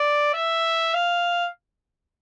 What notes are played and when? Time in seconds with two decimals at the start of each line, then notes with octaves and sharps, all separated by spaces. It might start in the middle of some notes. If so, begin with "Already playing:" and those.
Already playing: D5
0.34 E5
0.94 F5